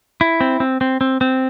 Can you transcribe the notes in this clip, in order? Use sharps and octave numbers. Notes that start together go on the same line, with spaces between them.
E4
C4
C4
C4
C4
C4